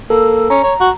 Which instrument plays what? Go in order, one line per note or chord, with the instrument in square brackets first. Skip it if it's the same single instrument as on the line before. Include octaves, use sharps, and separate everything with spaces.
[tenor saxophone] A#3 [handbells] A4
[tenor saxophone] C#4 [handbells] A#5
[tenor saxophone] C#5
F#4